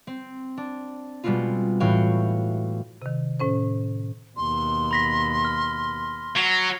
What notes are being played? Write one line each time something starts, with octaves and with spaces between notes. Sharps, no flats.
C4
D4
B2 G3 G#3 B3 C4 F4
A2 E3 F#4 C#5 F5 G5
C3 D#3
A2 C#4 C5
D#2 B2 C6
B5 A#6 B6
F6
F#3 C7 F7